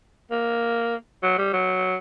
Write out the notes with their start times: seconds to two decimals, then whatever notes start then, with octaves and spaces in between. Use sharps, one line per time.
0.31 A#3
1.23 F#3
1.38 G3
1.53 F#3